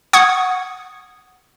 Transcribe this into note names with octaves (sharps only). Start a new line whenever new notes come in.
F#5 C#6 D#6 G#6